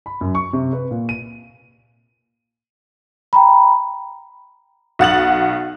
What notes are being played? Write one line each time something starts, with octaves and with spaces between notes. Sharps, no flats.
B5
F#2
C#6
C3
B4
A#2
D#7
G5 A#5 B5
B1 F#5 A6 F#7